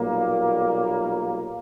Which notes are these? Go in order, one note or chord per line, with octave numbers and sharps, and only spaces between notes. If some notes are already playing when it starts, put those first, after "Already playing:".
Already playing: B1 A#2 G3 A#3